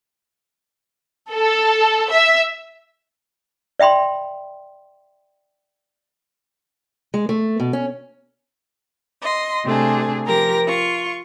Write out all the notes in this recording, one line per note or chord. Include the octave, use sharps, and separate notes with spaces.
A4
E5
D5 E5 G5 B5 C6
G#3
A3
B2
C#4
D#5 C6
C3 A3 D4 G#4
F3 G4 A#4 A#5 A#6
F4 C#6